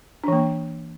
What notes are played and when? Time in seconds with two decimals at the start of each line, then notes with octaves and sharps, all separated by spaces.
0.24 D4
0.28 E3
0.32 A#3